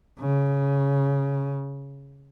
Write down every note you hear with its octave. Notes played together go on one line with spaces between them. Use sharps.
C#3